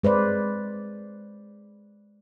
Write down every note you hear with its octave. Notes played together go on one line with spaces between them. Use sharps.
G#3 B4 C5 D5